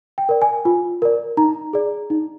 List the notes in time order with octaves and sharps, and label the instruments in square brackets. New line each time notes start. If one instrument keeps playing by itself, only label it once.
[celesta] G5
A#4 D5
G#5
F4
A#4 D5
D#4 A#5
G#4 D5
D#4